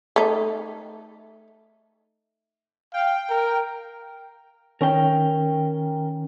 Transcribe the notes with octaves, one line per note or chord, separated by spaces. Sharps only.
A3 D#4
F5 G5
A#4
D#3 C#4 A#4 G5